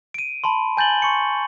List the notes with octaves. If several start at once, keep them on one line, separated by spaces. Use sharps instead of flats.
D7 D#7
A5 B5 C6
G#5 G6 A6 F#7 G7
C6 C#6 C#7